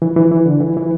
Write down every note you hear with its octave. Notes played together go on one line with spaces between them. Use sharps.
E3
E3
E3
D3
E3
E3